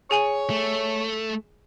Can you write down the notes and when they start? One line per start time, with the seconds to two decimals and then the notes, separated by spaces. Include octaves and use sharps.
0.11 G#4 C#5 G#5 F#7
0.50 A3